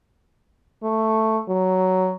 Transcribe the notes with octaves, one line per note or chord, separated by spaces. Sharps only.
A3
F#3